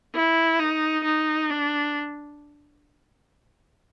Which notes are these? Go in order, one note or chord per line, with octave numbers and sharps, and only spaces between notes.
E4
D#4
D#4
D4